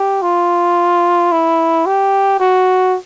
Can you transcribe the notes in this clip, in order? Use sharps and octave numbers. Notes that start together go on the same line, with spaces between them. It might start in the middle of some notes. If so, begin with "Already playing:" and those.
Already playing: G4
F4
E4
G4
F#4